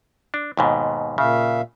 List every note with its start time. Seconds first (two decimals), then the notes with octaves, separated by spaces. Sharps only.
0.34 D4
0.57 D#2 G#2 B2
1.18 A#2 C#3 E5 F5